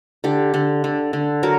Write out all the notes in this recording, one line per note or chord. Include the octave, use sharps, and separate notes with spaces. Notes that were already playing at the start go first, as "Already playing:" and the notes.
D3 G4
D3
D3
D3
F#3 A#4